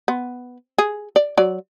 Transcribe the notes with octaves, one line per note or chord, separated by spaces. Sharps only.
B3
G#4
D5
F#3 D5